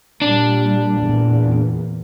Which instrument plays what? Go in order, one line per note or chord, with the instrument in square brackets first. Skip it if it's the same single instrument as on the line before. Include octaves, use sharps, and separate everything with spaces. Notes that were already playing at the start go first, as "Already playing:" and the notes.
[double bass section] A#2 G3 [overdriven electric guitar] D4
[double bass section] E2 A#2